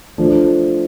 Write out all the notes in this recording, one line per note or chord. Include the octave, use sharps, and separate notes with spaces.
F3 A3 D4